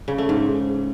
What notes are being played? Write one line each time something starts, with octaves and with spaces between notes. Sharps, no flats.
C#3
A3
G#2